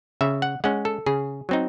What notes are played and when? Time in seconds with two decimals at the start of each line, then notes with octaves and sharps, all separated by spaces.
0.21 C#3 E5
0.42 F#5
0.64 G#3 C#4 F#5
0.85 A4
1.06 C#3 G#4
1.49 F#3 C4 D#4